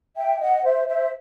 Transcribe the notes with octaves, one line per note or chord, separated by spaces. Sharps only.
E5 G5
D#5 F#5
C5 E5
C5 E5